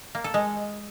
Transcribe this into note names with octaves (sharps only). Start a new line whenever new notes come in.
A#3
A4
G#3